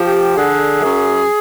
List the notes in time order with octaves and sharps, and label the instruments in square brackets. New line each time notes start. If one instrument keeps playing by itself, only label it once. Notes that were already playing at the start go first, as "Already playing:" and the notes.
Already playing: [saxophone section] F3 G4
D3 G#4
F#2